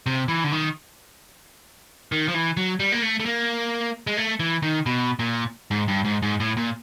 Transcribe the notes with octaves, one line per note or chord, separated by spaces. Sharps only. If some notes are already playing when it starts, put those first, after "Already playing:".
C3
E3
D3
D#3
D#3
F3
E3
F#3
G3
A#3
A3
A3
A#3
G#3
A3
E3
D#3
B2
A#2
G#2
G2
G#2
G#2
A2
A#2